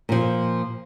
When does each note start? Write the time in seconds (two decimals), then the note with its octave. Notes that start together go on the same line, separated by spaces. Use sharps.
0.09 A#2 F3